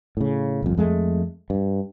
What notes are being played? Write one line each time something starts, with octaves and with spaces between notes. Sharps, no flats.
A2 C#3
G1 F2
F2 G#3 A3
G2